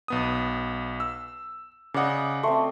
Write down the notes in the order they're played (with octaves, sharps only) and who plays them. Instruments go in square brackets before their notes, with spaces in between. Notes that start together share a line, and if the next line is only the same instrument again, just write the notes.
[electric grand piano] B1 B3 D#6
E6
[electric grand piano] C#3 F#5 [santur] D5 D#5
[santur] A3 C4 [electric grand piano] C6 C#6